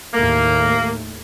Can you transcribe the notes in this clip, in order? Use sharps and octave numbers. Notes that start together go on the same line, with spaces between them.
D#2 A2 A3 A#3